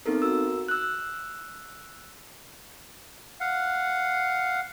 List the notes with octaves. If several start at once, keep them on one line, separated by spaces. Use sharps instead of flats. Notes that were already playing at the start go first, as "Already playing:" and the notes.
B3 C4 D#4 A4 A#4
F#4 A#4 E6
E6 F#6
F5 F#5